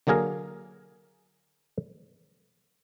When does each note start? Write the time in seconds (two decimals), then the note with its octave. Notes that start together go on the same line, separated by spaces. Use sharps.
0.07 D3 F#3 A#3 G#4 A#4